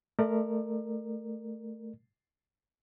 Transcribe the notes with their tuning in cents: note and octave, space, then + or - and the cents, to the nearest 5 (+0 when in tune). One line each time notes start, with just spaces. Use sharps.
A3 +0 A#4 +0 D5 +40